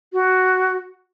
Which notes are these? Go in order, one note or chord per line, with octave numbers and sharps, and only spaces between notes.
F#4